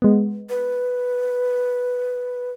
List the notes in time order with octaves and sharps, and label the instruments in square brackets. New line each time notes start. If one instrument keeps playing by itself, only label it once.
[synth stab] G#3 B3
[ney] B4